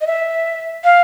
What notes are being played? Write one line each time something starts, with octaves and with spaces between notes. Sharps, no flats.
D#5
E5
F5